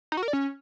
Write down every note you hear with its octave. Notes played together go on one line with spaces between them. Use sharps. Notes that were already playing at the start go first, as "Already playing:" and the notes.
D#4
F#4
A#4
D5
C#4